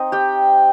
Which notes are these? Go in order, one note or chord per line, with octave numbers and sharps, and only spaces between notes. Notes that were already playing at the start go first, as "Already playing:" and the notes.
Already playing: C4 D#4 C5 D#5
G4 G5